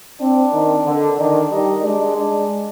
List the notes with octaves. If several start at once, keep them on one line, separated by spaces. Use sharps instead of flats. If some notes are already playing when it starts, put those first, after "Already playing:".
C4 D4
D#3
D3
D#3 D4
G3 D#4
G#3 D4
D4